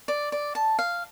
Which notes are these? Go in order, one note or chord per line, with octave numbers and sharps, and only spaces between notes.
D5
D5
A5
F5